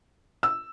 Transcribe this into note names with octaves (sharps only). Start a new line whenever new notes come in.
E6